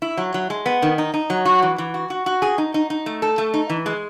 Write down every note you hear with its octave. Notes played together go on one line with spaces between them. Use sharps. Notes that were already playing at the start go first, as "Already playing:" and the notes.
E4
F#3
F#3
G#3
B3
D#3
D#4
D#4
F#3
F#4
E3
E3
F#4
F#4
F#4
G#4
D#4
D#4
D#4
A3
A4
A3
D#4
E3
G#3